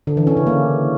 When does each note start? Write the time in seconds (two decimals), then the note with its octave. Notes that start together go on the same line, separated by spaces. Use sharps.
0.07 D3
0.17 E3
0.27 C#4
0.37 C#3
0.47 A#3